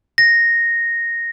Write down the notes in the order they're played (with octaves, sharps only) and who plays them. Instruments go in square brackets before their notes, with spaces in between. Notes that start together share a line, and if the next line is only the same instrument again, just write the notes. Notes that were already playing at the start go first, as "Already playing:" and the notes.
[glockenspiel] A#6